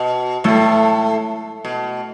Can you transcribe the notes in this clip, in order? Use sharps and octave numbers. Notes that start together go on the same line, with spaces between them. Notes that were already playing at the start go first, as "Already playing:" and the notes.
Already playing: B2
A2 A3
B2